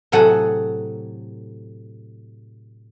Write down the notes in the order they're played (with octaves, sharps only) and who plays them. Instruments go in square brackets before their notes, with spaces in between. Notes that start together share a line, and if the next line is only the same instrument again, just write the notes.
[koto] A2 C3 F#3 G#4 A4 F#5